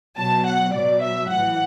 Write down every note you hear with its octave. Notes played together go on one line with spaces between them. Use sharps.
B2 F#3 A5
F#5
B2 F#3 D5
E5
A2 E3 F#5